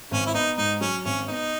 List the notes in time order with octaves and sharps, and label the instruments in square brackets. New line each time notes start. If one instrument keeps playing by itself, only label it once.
[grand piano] G#1 [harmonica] C#4
[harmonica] E4
[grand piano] B3 [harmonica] D#4
[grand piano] G#2 [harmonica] D#4
[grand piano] F#3 [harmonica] C#4
[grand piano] G#1 [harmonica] C#4
[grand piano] B3 [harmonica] D#4